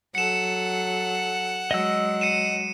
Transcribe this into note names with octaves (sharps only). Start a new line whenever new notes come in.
F#3 A4 F#5 C#7 E7
F#3 G#3 D#5 E6
C#7 D#7 E7